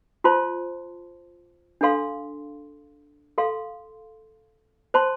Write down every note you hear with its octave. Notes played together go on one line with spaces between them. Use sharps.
F4 C5 A5 C6
D4 A4 F5 C6
A4 F5 C6
C5 A5 C6